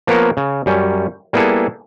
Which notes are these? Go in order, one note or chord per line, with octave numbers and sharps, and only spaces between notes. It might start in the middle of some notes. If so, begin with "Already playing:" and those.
F3 A#3 B3 A#4 C#5
C#3
F#2 G3 C#4
G3 A#3 B3 E4 G#4 A4